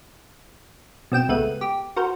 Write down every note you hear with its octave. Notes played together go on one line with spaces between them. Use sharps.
B2 C4 G5 E7
C#2 A3 B3 F#6 D#7
G4
F#4 A#4 C5